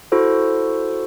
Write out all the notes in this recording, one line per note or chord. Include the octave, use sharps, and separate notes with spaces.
E4 F#4 A4 C5